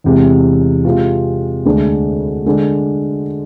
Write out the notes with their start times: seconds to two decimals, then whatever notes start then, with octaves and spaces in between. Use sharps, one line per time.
0.04 E2 C3 G#3
0.85 C3 G#3 C4 F4
1.65 D2 D3 G#3 D4
2.46 D3 G#3 D4